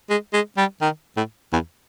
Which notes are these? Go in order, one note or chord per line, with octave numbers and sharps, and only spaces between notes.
G#3
G#3
G3
D#3
A2
E2